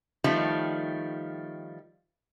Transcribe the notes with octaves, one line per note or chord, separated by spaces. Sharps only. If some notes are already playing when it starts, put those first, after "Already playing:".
D#3 F3 G3 A3